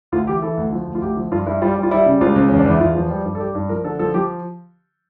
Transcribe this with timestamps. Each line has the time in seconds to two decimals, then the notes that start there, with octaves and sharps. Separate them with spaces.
0.12 D2 F4
0.27 E3 G4
0.42 E3 A4
0.57 D2
0.72 F3
0.87 D2
0.95 F4
1.02 D2 G4
1.17 F3
1.31 G2 F4
1.46 G2 E4
1.62 G3 F4
1.76 G3
1.83 F4
1.91 G3 E4
2.06 C#3
2.21 C#2 F4
2.36 C#2
2.48 E2 C#4
2.59 D4
2.66 E2 E4
2.80 E2 F4
2.95 F3
3.10 G3
3.25 G2
3.35 A4
3.40 G3 G4
3.55 G2
3.69 F3 A#4
3.84 D3 A4
3.99 F3 A4
4.14 F3 G4